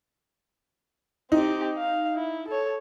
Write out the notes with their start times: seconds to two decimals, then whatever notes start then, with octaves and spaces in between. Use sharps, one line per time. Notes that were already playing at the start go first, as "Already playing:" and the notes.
1.32 C4 D#4 G4
1.77 F5
2.15 E4
2.48 A4 C#5